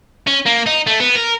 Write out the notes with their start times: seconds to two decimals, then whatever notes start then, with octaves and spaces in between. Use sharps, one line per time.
0.27 C#4
0.46 A#3
0.66 D#4
0.87 A3
1.00 B3
1.15 A#4